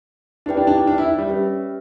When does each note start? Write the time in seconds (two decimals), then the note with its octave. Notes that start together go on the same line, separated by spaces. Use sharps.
0.46 D4 E4 G4 B4 D5 G5
0.57 D4
0.67 D4
0.87 D4
0.98 E4
1.18 G3
1.29 C#4 G4 B4 E5